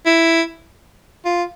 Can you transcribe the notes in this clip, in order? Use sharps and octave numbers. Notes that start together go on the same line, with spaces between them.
E4
F4